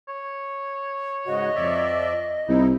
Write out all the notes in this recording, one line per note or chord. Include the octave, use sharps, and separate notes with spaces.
C#5
G#2 C#3 F#4 D#5
F2 D5 E5
C2 D#4 E4